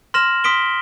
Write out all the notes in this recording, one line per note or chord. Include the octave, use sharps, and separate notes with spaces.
C6 F6 A#6 E7 F#7
C6 D#6 B6 D7 G7